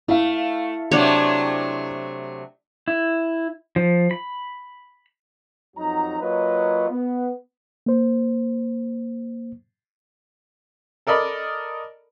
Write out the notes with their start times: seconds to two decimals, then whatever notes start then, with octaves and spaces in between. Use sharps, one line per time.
0.08 A3 E4 F5
0.91 C3 F#3 A3 D4 C#5
2.88 E4
3.76 F3
4.11 B5
5.77 F2 F#3 D#4 F#4 A#5
6.20 F#3 A#3 F4 B4 C#5 D#5
6.90 B3
7.86 A#3 C5
11.07 A4 A#4 D5 D#5 B5